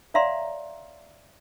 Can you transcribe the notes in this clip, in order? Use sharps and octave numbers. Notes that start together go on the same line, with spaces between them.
C#5 D5 E5 F5 A#5 C6